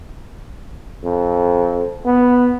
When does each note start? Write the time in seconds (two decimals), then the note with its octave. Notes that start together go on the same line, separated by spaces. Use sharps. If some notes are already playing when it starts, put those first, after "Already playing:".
1.04 F2
2.06 B3